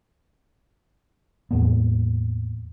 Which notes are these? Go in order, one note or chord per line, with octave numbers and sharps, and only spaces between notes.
E2 A2 A#3 B3